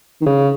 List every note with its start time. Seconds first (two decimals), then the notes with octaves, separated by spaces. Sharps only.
0.21 D#3
0.26 C#3